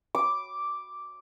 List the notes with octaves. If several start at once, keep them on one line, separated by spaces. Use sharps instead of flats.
D6